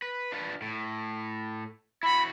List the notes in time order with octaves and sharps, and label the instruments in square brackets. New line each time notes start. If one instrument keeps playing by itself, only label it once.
[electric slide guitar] B4
D4 F4 B4
A2
[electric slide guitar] E4 F#4 [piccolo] B5